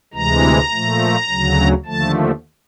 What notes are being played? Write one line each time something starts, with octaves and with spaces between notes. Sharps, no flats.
D2 C3 E3 G#3 A#5
A#2 F3 A3
D2 C#3 F#3
D#2 D3 F3 A3 A5